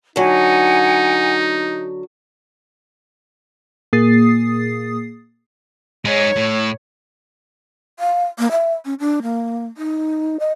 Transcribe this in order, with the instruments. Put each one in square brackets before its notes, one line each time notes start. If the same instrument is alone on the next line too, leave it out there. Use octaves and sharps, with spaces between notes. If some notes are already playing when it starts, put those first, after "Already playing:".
[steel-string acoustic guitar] D3 F#3 [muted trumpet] D#4 [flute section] F#5 G#5
[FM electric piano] A#2 A#3 G#4 D#6 A6 C7
[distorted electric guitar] G#3 D#4 [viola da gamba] C#5
[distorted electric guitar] A2
[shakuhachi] F5
A#3
E5
C#4
D4
A#3
D#4
D#5